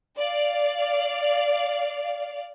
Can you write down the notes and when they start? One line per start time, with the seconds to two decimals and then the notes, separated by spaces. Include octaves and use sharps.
0.19 D5 F5